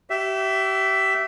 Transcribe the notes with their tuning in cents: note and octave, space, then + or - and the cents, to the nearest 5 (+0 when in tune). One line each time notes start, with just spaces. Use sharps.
G4 -35 E5 +5